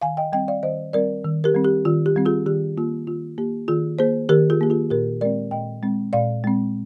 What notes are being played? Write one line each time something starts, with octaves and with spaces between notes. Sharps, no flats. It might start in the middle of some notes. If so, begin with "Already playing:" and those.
D#3 F5 G#5
D#5 G5
G3 C4 D#5 G5
D5 F5
D#3 C5 D#5
G3 C4 A#4 D5
D#3
G4 A#4
G3 C4
G4
D#3 F4
G4
G3 C4
F4 G#4
D#3 G4
A#3 F4
D#3 F4
A#3 G4
D#3 F4 G#4
A#3 G#4 C5
D#3 G4 A#4
F4 G#4
A#3 G4
F4 G#4
A#2 G4 A#4
G#3 C4 A#4 D5
A#2 D#5 G5
G#3 C4
A#2 D5 F5
G#3 C4